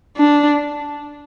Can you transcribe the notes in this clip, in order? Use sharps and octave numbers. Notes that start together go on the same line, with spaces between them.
D4